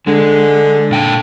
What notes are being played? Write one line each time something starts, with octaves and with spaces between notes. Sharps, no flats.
D3 G#3
A#2 G5 A5